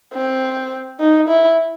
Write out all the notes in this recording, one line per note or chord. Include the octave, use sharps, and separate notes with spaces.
C4
D#4
E4